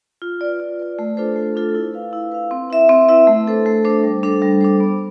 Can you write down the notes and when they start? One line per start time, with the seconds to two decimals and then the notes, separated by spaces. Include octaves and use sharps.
0.22 F4
0.41 B4 D5
0.60 F4
0.80 B4 D5
0.99 A3
1.17 D4 F4 A4 C5
1.36 A3
1.55 D4 F4 A4 C5
1.75 E4
1.94 B4 F5
2.13 E4
2.32 B4 F5
2.51 C4
2.70 E4 B4 E5
2.89 C4
3.08 E4 B4 E5
3.27 A3
3.47 D4 A4 C5
3.66 A3
3.85 D4 A4 C5
4.04 G3
4.23 D4 A4 C5
4.42 G3
4.61 D4 A4 C5
4.80 B3